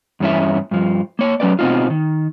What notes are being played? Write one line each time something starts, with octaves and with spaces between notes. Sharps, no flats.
E2 G2 C#4 E4 E5
G2 F3
A#3 C#5
F#3 C#4 B4 D5
B2 B3 C4 D#4 F4
D#3